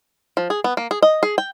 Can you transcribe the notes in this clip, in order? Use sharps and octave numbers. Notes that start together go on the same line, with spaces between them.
F3
G#4
B3
A#3
G#4
D#5
G#4
G5